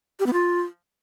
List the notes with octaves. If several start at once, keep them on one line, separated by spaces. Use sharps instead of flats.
G4
B3
F4